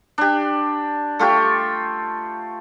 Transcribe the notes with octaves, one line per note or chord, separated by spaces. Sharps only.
D4 G4
A3 F4 G4 C#6